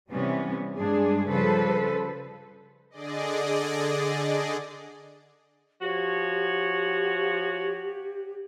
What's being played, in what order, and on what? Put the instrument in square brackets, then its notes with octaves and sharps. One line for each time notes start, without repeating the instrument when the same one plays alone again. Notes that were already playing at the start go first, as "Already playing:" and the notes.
[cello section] C3 E3 G3 B3 C#4
G2 G#3 D4 G#4
C#3 F3 G3 A4 B4 C5
[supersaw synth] D3 G#4 D5 D#5
[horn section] F3 F#4 C#5 [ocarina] G4